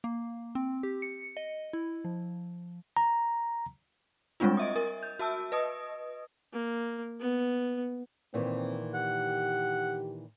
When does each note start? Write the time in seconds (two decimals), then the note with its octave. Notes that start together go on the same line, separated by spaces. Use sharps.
0.04 A#3
0.55 C4
0.83 G4
1.02 C#7
1.37 D#5
1.73 E4
2.05 F3
2.97 A#5
4.40 G3 G#3 C4 D4 F4
4.57 D#5 E5 D#6
4.76 A#4
5.03 G6
5.19 F#4 E5 A5 E6
5.52 B4 D#5 D#6
6.53 A#3
7.20 B3
8.34 A#2 D#3 E3 C4
8.94 G4 F#5